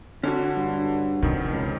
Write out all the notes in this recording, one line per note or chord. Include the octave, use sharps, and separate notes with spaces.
D3 C#4 D4 F#4
G2
F2 C3 D#3
C#2